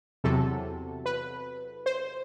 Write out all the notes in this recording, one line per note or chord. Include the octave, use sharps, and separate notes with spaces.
E2 C3 F#3 A4
B4
C5